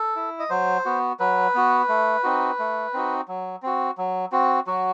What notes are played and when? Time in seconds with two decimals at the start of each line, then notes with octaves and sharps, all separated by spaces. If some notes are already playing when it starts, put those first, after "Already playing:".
Already playing: A4
0.16 E4
0.39 D#5
0.50 F#3 C5
0.85 B3 F#4
1.20 F#3 B4
1.55 B3 F#4
1.89 A3
2.24 C4 D#4 F#4
2.59 A3
2.94 C4 D#4 F#4
3.28 F#3
3.62 C4 F#4
3.98 F#3
4.32 C4 F#4
4.67 F#3 F#4